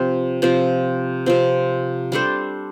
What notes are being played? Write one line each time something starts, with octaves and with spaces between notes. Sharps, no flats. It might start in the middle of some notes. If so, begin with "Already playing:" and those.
Already playing: C3 F3 C4
C3 F3 C4
C3 F3 C4
G3 D4 A4 C5